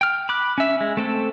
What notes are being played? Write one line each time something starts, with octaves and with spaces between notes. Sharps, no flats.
G5 F6
B5 D6 F#6
C#4 E5
G#3
A3 C4 A4